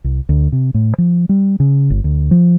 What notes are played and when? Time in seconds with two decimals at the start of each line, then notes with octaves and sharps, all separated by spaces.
0.04 C2
0.29 D2
0.52 C3
0.74 A2
0.98 F3
1.29 G3
1.60 C#3
1.90 G1
2.04 D2
2.31 F3